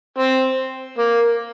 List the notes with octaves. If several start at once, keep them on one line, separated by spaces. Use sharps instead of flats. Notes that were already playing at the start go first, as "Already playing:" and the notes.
C4
A#3